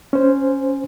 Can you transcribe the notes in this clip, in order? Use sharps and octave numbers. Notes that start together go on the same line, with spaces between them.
C#4 C5